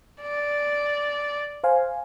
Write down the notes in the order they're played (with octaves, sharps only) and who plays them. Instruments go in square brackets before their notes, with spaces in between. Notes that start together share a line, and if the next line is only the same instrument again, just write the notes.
[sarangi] D5
[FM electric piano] C5 F5 G#5